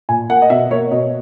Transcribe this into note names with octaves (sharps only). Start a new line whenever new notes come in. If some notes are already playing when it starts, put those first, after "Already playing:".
A#2 G#5
A#3 F#5
D#5
B2 E5
A#3 C#5
B2 D#5